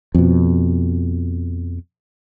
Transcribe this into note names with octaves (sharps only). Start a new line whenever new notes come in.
F2 B2